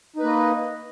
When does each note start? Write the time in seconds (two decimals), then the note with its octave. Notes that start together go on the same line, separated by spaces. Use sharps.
0.16 D#4
0.20 B4
0.23 A#3
0.26 D#5